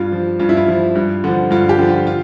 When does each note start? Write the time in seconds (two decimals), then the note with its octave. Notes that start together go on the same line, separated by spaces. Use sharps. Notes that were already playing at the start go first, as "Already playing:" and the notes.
Already playing: G2 F4
0.12 F3
0.39 G2 F4
0.49 E4
0.57 F4
0.68 F3
0.95 G2
1.24 D3 F3
1.50 G2 F4
1.69 G4
1.78 D3 F3
1.89 F4
2.07 F4